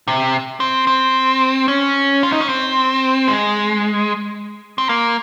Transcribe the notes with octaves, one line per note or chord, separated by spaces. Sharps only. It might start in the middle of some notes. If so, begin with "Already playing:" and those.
C3
C4
C4
C#4
F4
D#4
C#4
C4
G#3
C4
A#3